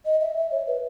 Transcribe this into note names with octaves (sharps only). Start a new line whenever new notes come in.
D#5
E5
E5
C#5
B4